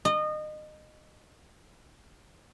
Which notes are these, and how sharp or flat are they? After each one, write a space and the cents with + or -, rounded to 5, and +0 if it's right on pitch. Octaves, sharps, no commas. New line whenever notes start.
D#5 -25